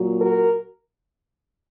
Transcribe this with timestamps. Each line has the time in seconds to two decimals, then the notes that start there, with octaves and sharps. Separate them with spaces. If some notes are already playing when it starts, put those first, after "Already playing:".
Already playing: A#2 F#3
0.21 F#4 A#4